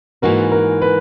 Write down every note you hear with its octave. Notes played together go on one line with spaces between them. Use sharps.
G#2 E3 A#3 D#4 F#4 A#4
A#4
B4